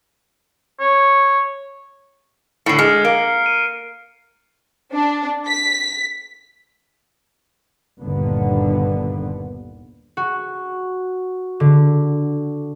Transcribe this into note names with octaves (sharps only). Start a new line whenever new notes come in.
C#5
A2 D3 C7 C#7
G#3 F6
A#3 D7
D#7
D4
B6
G1 D#2 A#2 D3 B3
F#4
D3